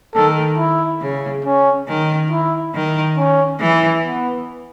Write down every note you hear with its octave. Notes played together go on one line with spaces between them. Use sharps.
D#3 A4
E4
C#3
C#4
D#3
E4
D#3
C#4
E3
B3